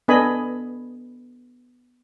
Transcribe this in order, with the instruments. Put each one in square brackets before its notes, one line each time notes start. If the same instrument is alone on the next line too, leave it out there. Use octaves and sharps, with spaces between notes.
[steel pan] B3 D4 A4 D#5 G#5 B5